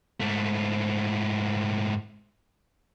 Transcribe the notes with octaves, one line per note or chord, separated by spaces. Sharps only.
G#2 A3